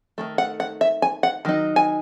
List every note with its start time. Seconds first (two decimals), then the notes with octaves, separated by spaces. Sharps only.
0.18 D#3 F#3 A3
0.38 F#5
0.60 F#5
0.81 E5
1.02 G#5
1.23 F#5
1.45 D#3 F#3 D#4
1.76 G#5